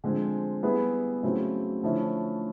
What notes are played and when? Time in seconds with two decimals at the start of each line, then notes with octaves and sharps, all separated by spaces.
0.04 D3 F3 G#3 C4
0.63 G3 B3 E4 G#4 B4
1.23 C#3 F#3 A3 C4 E4
1.83 D3 F3 A3 C#4 E4